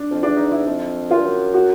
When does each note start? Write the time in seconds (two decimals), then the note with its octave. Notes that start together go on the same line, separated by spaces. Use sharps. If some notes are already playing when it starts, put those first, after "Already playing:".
Already playing: D4
0.11 F2
0.23 E2 D4
0.36 D#4
0.51 E4
0.66 F2
1.11 F#2 F4
1.18 G2
1.25 F#2
1.54 F#4